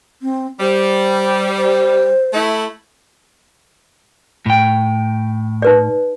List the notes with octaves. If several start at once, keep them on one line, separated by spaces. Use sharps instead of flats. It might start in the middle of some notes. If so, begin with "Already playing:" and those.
C4
G3 C5
C5
A3 E4
A2 G5
D#4 B4 D5